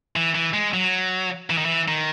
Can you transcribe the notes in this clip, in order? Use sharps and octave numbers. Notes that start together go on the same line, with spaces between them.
E3
E3
G#3
F#3
E3
D#3
E3
D#3